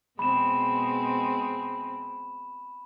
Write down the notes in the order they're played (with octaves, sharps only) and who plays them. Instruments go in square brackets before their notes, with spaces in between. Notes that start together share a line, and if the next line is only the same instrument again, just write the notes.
[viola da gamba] B2 G#3 C4 [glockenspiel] B5 E7